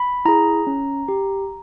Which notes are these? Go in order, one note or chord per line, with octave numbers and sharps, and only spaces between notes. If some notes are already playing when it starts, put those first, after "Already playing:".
Already playing: B5
E4 G#4 A#5
C#4
G4